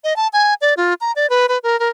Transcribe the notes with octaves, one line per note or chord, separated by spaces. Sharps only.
D#5
A5
G#5
D5
F4
A#5
D5
B4
B4
A#4
A#4